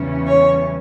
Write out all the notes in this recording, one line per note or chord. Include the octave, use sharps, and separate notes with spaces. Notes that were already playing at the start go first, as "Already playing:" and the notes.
Already playing: E2 C#3 E3 G3 C#4
C#5